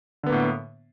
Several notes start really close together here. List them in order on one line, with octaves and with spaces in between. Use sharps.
D3 B3 A#3 A2